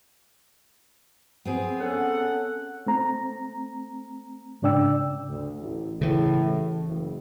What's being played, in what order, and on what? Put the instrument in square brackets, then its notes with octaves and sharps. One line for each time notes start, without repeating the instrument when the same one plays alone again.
[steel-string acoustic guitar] B3 C4 G#4
[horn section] C#4 A4 F#5
[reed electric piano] A3 C4 A#5
G#2 C#3 D4 D5 G5 E6
[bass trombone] D2
A1
[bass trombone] A2 [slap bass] C#3 E3
[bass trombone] A1
F#1